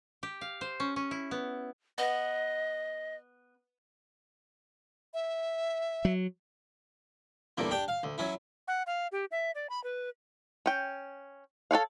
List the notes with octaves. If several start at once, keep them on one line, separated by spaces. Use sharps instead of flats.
G4
F5
C5
C#4
C#4
E4
B3
B3 D#5
E5
F#3
E2 G2 D3 A#3
D4 G4 G5
F5
D2
F#3 C#4 E4
F#5
F5
G4
E5
D5
B5
B4
C#4 G5
A4 B4 C#5 F5